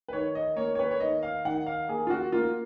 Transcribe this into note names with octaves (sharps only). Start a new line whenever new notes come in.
B4
D#3 C#5
D#5
A#3 C#5
C#5
B4
C#5
D#3 D#5
F5
D#3 F#5
F5
A#3 G#4
F4
F#4
A#3 F4